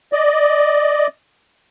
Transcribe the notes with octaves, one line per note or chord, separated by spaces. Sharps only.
D5 D#5